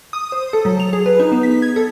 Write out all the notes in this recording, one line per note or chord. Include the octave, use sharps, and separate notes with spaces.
D#6
C5
A4
F#3
F7
G#4
B4
D#4
B3
B6
G#6
A4